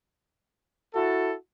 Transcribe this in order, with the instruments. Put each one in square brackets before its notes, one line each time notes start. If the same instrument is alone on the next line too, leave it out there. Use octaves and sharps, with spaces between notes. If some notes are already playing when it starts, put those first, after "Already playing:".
[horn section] E4 F#4 A4